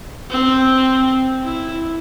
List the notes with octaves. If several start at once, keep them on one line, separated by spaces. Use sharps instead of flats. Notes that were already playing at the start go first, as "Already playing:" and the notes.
C4
E4